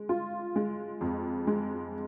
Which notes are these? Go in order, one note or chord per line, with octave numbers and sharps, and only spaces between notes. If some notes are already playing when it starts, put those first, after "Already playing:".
Already playing: G#3
F4
G#3
F2
G#3